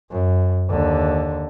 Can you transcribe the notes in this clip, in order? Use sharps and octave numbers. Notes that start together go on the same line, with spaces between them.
F#2
D#2 D3